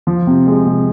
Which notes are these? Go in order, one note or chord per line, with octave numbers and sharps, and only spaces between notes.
F3
C3
G#3
C3